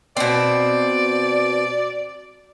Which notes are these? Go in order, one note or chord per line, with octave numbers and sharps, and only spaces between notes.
B2 C4 D5